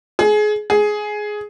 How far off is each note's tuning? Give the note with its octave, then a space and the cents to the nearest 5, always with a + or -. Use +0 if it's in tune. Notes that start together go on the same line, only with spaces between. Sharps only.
G#4 +25
G#4 +10